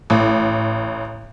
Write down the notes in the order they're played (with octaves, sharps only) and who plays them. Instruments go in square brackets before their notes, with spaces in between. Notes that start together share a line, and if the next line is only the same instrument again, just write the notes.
[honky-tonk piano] A1